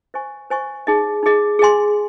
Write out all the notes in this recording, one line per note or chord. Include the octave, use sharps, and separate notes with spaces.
C5 D#5 G#5 C#6
C5 D#5 G#5 C#6
D#4 G#4 D#5
D#4 G#4 D#5
G#4 D#5 G#5 C6